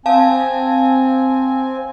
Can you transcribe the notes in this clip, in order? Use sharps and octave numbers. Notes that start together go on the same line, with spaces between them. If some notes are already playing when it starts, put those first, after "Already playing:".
C4 F5 G#5 A5